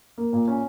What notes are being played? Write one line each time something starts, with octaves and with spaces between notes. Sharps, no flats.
A#3
A#2
C#4